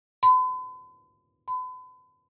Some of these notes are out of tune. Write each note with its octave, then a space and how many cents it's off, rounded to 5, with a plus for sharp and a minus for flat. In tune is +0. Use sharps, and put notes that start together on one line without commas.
B5 +45
B5 +40